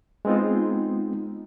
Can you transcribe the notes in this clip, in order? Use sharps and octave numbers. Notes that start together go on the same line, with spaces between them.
G#3 B3 C4 D#4 F4